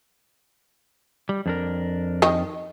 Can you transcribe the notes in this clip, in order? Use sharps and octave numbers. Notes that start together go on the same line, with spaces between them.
G3
F2 D4 A#4
D#3 D#5 G5